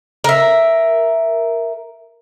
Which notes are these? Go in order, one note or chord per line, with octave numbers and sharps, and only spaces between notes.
A#4 E5